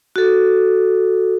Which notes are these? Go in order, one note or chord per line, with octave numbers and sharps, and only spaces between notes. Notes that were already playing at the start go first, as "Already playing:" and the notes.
F#4 A4